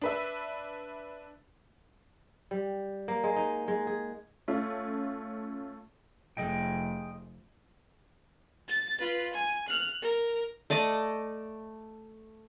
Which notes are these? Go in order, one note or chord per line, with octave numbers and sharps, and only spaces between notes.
D4 B4 E5
G3
A#3
G#3
D#4
G#3
G#4
A3 C#4 F4
F1 G#4 D#5 G5
A6
F4 B4
G#5
F6 F#6
A#4
A3 D5 D#5 D6